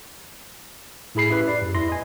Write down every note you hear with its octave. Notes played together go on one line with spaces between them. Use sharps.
A2 E4 G#4 B5 C7
C#4 E4 G4 B4
D5
F#2
E2 E4 C6 A#6
D#5 G#5